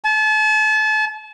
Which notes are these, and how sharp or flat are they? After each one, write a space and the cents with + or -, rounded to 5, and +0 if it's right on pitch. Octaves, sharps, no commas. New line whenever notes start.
A5 -35